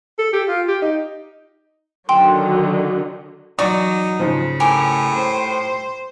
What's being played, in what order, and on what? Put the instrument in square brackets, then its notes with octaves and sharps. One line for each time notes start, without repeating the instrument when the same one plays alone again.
[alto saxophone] A4
G4
F4
G4
D#4
[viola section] D3 D#3 F#3 [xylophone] G5 C6
[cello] E3 F#3 [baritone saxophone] D#4 [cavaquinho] F#4 [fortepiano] D5
[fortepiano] G#2 F3 [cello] C#3
[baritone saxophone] A2 [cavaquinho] G4 A#4 G#5
[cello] C5